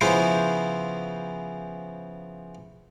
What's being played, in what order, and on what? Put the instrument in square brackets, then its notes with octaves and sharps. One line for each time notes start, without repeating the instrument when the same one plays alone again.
[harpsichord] C#3 F3 B3 C#4 E4 C5